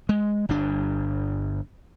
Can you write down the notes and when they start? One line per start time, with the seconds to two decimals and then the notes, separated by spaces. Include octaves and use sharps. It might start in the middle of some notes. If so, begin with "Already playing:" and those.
0.09 G#3
0.49 G1 G2 D4